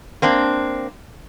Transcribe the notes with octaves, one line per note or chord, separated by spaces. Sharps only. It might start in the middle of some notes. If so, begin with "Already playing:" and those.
A#3 C4 D4